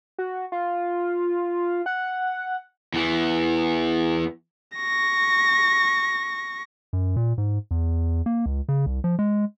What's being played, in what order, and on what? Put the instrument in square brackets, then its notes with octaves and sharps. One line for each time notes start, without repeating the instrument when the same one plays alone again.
[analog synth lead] F#4
F4
F#5
[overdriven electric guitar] E2 E3
[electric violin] C#6 A#6
[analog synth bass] F#2
A#2
G#2
E2
A#3
C#2
C#3
C2
F3
G#3